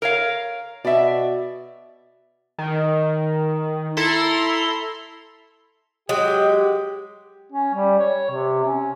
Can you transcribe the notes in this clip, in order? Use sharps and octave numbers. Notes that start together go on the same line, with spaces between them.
A#4 C#5 F5
B2 D5 E5
D#3
E4 A4 A#5 C6
F#3 G#3 G4
C#4
G3
C#5
C3
C#4